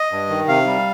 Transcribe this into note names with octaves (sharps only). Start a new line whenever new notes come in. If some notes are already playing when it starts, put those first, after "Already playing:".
Already playing: D#5
G2
D#3
C3 F5
G3